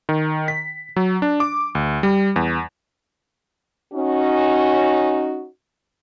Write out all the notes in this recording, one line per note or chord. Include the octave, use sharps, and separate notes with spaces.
D#3
B6
F#3
D4
D6
D2
G3
E2
C#4 D#4 F#4